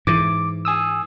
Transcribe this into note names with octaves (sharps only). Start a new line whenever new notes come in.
G#2 E3 D6
G#5 D#6 E6